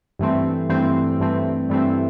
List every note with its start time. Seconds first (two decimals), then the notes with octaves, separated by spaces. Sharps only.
0.19 G2 E3 A3 C4
0.69 G2 E3 A3 C4
1.20 G2 E3 A3 C4
1.69 G2 E3 A3 C4